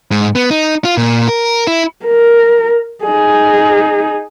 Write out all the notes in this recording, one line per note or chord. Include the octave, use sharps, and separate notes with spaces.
G#2
B3
D#4
F4
A#2
A#4
E4
A#4
D#4 G#4